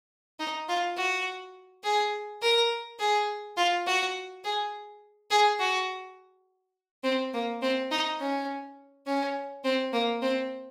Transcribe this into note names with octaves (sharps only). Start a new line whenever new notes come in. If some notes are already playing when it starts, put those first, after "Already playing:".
D#4
F4
F#4
G#4
A#4
G#4
F4
F#4
G#4
G#4
F#4
C4
A#3
C4
D#4
C#4
C#4
C4
A#3
C4